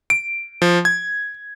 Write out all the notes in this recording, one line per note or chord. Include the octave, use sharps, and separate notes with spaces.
D7
F3
G#6